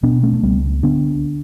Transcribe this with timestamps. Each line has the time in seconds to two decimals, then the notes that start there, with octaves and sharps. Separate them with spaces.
0.03 B2 B3 D4
0.23 A3 C#4
0.33 A3
0.43 C#2 G3 B3
0.83 D3 B3 D4